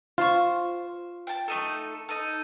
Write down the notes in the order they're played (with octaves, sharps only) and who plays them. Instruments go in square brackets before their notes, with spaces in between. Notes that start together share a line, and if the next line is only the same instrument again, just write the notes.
[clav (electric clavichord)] F4 [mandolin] C5 C#6
[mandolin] G5 A5
A3 D#4 A4
D#4 A4